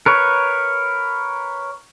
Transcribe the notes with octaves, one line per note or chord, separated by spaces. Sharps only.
A#4 B4 C#5